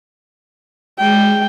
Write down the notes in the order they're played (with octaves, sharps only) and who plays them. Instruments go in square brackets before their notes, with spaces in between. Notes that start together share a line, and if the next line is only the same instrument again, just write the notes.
[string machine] G#3 [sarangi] G5